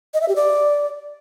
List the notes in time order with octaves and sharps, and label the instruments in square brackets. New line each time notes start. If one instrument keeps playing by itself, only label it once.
[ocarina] D#5
E5
G4
D5